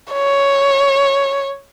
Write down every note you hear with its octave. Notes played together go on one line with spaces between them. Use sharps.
C#5